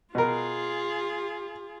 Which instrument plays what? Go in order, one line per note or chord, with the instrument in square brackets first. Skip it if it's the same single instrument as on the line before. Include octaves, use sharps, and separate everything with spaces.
[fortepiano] B2 A#4 [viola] F4 G#4